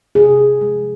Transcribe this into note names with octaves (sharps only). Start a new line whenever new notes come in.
C3 G#4
F3 G#3